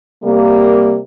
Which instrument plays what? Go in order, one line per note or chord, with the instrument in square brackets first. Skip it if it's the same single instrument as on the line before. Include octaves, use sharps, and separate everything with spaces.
[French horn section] C3 G3 A#3